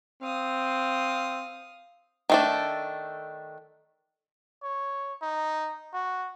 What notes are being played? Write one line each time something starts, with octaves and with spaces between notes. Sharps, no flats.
C4 F5 D#6
D#3 A3 D4
C#5
D#4
F#4